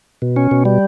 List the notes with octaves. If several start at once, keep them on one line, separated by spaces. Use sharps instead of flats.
B2
C#4
B2
G3